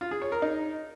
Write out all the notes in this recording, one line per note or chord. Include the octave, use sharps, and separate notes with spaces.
F4
G#4
C#5
A#4
D#4